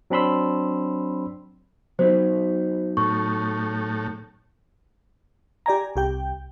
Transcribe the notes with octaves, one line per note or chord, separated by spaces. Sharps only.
F#3 C4 D4 B5 C6 E6
F#3 B3 D#4 C5
A2 C#6
G4 D5 G#5 A#5
C2 G4 G5